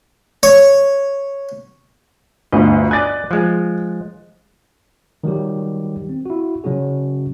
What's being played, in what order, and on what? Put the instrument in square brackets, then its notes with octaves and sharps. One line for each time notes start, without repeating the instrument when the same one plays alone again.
[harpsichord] C#5
[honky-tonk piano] G1 D2 [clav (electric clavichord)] D#5
[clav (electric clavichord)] D5 D#5 G#5 [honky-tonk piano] F#6 A6
[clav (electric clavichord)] F3 G#3
[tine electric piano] D#3 F#3 G3 G4
C4
E4 F#4
C#3 F#3 C#4 F#4 G#4